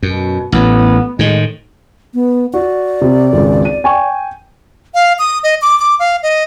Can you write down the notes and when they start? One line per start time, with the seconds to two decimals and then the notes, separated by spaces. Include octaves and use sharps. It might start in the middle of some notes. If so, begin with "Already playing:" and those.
0.03 F#2 B2
0.52 A1 A2 B3
1.19 A2 D#3 G#3
2.14 B3
2.54 F#4 D5
3.01 C3
3.33 G#1 C#2
3.65 D#7
3.84 G5 G#5 C#6
4.95 F5
5.19 D#6
5.43 D#5
5.62 D6
5.79 D6
6.00 F5
6.23 D#5